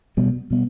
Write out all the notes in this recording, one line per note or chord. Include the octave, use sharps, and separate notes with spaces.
B2 G3 B3
B2 G3 B3